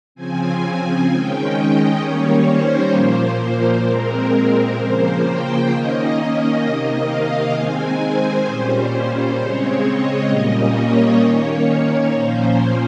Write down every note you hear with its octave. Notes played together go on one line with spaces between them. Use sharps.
C#3 F3 C4 G#5
D#3 G#3 C#4 G5
D#5
D#3 G3 A#3 C#4 C#5
C5
A#2 F3 A#3
A#2 G#3 C4 A#4
A#4
C#3 F3 A#3 C5
G5
D#3 A#3 C#4 D#5
C3 D#3 A#3
F5
D#3 G#3 C4 G#5
C5
A#2 G3 C#4
C#3 G#3 C4 C#5
D#5
A#2 G3 A#3 C#4 D#5
C#5
D#3 A#3 C#4
C#5
A#2 F3 A#3 C#4 C5